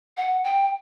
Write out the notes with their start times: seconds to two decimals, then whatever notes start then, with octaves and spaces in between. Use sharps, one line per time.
0.17 F#5
0.44 G5